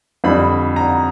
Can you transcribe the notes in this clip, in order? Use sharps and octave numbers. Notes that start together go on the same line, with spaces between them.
F2 D3 G3 B5
A#5